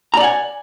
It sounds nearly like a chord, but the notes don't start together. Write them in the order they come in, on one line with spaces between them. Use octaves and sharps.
A#5 D5 F#5 G#5